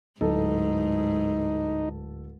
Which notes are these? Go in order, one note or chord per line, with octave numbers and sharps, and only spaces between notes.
D1 G#2 D#4 A4